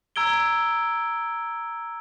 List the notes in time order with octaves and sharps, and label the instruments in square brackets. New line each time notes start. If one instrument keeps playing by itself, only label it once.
[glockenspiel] A#5 E6 G#6 D7 G7